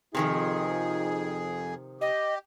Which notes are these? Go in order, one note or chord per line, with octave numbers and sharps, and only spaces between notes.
F2 C3 D#3 F3 D#4 G#4
G4 D#5